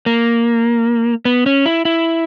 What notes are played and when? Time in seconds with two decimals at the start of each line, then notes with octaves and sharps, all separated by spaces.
0.06 A#3
1.25 B3
1.46 C#4
1.66 E4
1.85 E4